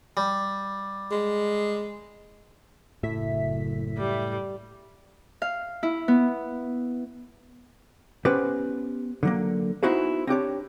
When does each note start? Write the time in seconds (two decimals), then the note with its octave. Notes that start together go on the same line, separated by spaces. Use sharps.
0.17 G3
1.11 G#3
3.03 F#1 A2 E5 B6
3.98 G3
5.42 F5
5.83 E4
6.08 B3
8.25 B3 C#4 G4 B4 C5
9.23 D3 F#3 A#3
9.83 B3 D#4 E4 F#4 G#4 C5
10.27 C4 D4 G4 C#5